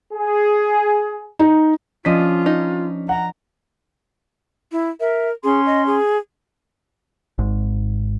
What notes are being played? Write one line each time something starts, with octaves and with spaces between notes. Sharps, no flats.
G#4
D#4
F3 C#4 D4 F4 D#5 B6
D#4
F#5 A#5
E4
A#4 E5
C#4 G#4 C6
D#5
G#4
G#1 G#2